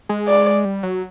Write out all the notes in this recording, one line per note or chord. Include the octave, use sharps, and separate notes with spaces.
G#3
D5
G3
F#3